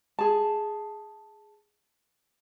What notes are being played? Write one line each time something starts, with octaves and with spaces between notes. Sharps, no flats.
G#4 A5